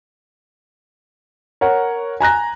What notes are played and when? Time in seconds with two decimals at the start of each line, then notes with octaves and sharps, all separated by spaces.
1.61 A#4 C#5 F#5
2.21 G#5 A#5 F#6 A#6